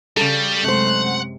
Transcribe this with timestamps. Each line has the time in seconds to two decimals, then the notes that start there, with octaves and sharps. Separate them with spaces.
0.17 C#3 G3 A4
0.64 F#2 C3 G#3 A3 C5 F#5